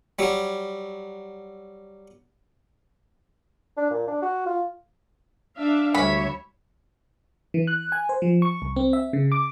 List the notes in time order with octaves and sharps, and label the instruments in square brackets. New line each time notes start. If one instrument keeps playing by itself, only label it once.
[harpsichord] F#3 G3
[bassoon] D4
A#2
D4
F#4
F4
[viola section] D4 E5 F5
[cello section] D2 G3 E5 [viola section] C#5 [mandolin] B5
[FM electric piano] E3
F#6
G#5
C5
F3
C#6
C2
C4
E5
C#3
D6